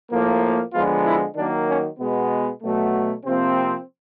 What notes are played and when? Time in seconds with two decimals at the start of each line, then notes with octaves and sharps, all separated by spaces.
0.11 A2 F3 A#3
0.73 D3 F3 G#3 B3 F4
1.05 E4
1.36 D#3 F#3 A#3 D4
1.68 C#4
1.99 B2 G#3 B3
2.62 B2 F#3 A3
3.25 C3 F3 A#3 C4